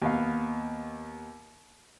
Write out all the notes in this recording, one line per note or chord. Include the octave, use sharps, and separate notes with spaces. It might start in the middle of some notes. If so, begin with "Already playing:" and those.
D#2 B3 F5